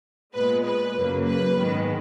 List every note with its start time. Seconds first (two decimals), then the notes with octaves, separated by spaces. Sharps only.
0.34 A#2 G#3 B3 B4
0.65 B4
0.95 F#2 C#3 F#3 A#3
1.27 B4
1.58 G#2 D#3 G#3 B3